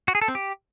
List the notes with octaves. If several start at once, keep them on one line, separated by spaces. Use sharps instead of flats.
F#4
G#4
A4
C4
G4